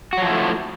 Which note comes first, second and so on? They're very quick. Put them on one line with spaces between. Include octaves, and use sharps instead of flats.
F#4 F#3 F3 E4 A3